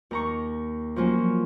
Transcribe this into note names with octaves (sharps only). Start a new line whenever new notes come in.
D#2 A#5 C#6
F3 F#3 A#3 C#4